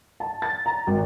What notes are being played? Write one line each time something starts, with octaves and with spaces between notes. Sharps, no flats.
A5
A6
A#5
G#1